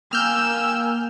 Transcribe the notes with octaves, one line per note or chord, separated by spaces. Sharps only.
A#3 G5 G#5 E6 F6 G6